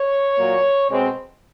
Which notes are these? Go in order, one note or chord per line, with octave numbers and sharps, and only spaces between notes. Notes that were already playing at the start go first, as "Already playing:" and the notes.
Already playing: C#5
A#2 F#3 A#3
B2 G#3 C4